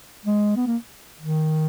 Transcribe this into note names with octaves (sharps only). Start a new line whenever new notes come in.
G#3
B3
A#3
D#3